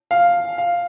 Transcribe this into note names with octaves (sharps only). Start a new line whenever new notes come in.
F5
F5